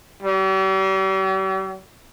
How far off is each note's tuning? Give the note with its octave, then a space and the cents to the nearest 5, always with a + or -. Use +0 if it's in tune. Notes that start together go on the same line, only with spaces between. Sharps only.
G3 -45